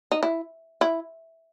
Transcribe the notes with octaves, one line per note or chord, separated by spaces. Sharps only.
D#4
E4
E4